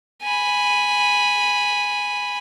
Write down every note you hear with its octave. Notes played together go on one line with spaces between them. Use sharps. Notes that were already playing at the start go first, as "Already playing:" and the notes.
G#5 B5